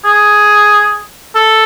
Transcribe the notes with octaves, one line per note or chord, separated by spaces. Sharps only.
G#4
A4